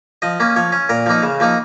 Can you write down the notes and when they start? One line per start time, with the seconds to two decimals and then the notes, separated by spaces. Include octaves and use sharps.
0.22 F3 D#5
0.40 A#3 C#4
0.56 F3 C#5
0.72 C#4
0.89 A#2 A#4
1.06 F3 A#3 D#4
1.23 C#3
1.40 F3 A#3 D#4